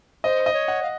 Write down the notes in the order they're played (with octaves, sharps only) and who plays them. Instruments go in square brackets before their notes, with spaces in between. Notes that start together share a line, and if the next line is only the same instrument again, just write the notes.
[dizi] C5 [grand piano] D#5
[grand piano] D#5
[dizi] C#5
[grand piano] F#5
[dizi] F5